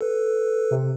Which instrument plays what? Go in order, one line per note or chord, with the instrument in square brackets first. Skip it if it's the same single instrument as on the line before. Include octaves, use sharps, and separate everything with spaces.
[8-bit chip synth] A4 B4
[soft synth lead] C3